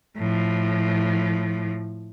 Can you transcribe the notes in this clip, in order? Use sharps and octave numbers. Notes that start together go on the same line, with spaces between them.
A2 F3